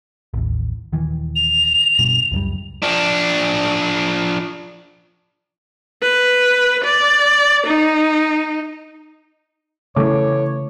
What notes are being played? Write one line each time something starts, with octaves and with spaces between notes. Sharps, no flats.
A1 D#2
D#1 D#3 E3
F7
G2 B2
C#2 F#2 G3
F3 D4
B4
D5
D#4
C#3 E3 A3 A4 C#5 D6